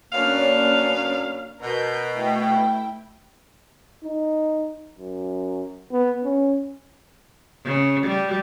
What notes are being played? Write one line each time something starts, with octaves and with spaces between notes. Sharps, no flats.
F#2 A#3 B3 C#4 D4 F5
B2 A#4 G6
A3 E4 G5
D#4
F#2
B3
C#4
C#3
G3